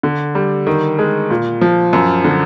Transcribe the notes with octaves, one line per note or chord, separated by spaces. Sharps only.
D3
G3
D#3
G#3
A#2
F3
F#2
D3